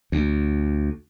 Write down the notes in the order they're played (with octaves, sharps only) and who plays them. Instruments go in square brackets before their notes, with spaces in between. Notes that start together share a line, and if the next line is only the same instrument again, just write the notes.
[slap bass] D2